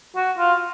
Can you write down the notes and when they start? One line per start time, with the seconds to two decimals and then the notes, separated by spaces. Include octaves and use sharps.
0.16 F#4
0.38 F4